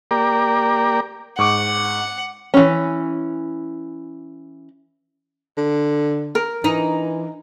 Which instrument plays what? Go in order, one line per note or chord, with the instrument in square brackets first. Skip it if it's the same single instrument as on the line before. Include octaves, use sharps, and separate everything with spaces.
[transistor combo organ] A#3 G4 A#4 D5
[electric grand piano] G#2 C#6 D6 [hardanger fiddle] F#5
[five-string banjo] E3 C#4
[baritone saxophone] D3
[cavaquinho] A#4
[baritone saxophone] E3 [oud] D#4